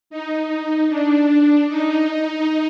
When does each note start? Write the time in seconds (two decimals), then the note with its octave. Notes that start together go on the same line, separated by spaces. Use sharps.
0.10 D#4
0.89 D4
1.68 D#4
2.07 D#4